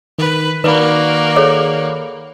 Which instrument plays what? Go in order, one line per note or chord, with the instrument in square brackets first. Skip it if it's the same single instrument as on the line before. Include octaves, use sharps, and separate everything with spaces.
[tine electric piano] D#3 [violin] B4
[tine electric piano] D#3 D5 B5 [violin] A#3 F#4 [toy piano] B4
[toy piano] G#4 A4 C#5